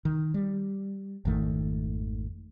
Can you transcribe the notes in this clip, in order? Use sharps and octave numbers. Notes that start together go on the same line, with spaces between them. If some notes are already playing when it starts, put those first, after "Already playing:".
D#3
G3
G#1 F2 D#3 A3